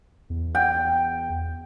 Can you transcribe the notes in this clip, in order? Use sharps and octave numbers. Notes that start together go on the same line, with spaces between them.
E2
G5